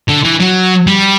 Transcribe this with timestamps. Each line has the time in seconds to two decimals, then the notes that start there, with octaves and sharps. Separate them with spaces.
0.09 D3
0.25 E3
0.41 F#3
0.87 G3